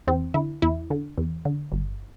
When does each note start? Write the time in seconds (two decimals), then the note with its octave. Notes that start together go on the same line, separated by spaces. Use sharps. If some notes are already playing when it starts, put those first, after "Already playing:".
0.07 E2 C4
0.34 D3 E4
0.62 E2 E4
0.90 D3
1.18 E2
1.45 D3
1.72 G1